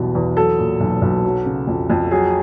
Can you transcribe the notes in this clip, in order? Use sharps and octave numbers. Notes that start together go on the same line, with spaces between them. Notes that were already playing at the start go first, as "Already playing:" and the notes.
Already playing: B1 E2 B2 G3
E2
F#3 A4
A#2
B1
B1
F#3
C#3
F2
F2
F#3 G#4